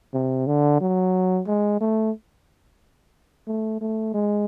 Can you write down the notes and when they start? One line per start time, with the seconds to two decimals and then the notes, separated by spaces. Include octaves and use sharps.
0.14 C3
0.47 D3
0.81 F#3
1.47 G#3
1.81 A3
3.47 A3
3.81 A3
4.14 G#3